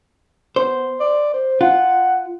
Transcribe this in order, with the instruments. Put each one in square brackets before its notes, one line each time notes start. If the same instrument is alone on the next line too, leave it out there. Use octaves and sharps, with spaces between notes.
[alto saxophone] B3 [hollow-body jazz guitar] C5
[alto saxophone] D5
C5
[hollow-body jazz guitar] F4 [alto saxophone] F#5